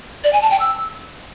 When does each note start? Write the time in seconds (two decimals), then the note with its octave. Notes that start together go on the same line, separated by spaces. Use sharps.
0.24 D5
0.33 G#5
0.42 A5
0.51 G5
0.60 E6